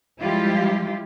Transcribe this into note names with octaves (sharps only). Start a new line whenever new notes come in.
F3 G3 G#3 E4 F4 G4